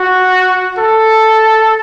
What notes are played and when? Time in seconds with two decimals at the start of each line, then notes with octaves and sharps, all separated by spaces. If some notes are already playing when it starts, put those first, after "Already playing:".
Already playing: F#4
0.78 A4